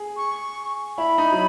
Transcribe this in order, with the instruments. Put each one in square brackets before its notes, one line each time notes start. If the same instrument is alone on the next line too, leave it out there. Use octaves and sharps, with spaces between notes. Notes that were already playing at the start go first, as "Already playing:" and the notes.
Already playing: [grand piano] G#4
[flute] C#6
[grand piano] E4 [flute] B5
[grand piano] D#4
F#3